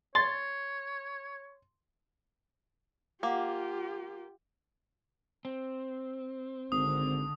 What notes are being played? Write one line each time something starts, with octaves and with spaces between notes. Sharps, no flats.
C#5 C6 A6
A#3 F4 G4 F5 F#5 D6
C4
G#1 D3 D#6